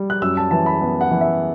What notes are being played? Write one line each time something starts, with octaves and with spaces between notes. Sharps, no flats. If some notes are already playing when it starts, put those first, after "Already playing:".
Already playing: G3
F#6
F#2 E6
A5
E3 A5
B5
B3
F#5
E3
E5